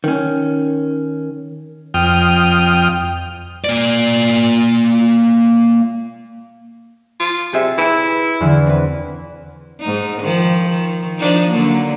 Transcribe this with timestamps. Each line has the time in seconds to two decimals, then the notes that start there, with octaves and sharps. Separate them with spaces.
0.04 D#3 C#4
1.94 F2 G5 D#6 F6
3.64 A#3 D5
7.20 F4
7.53 C3 G#4 E5
7.78 E4 B4
8.41 E2 D3 E3
8.66 C4 B4
9.80 G#2 D#4
10.21 D#3 F3
10.69 D#3
11.19 F3 D4 D#4
11.50 D3 F#3 A#3